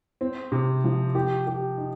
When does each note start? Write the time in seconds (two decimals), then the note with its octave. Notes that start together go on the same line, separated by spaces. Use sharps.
0.21 C4
0.52 C3
0.84 F3
1.15 G4
1.47 G4
1.78 D#4